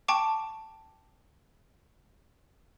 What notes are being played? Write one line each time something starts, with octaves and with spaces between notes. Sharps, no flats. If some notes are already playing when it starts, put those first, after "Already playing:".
G5 A5 C#6 D6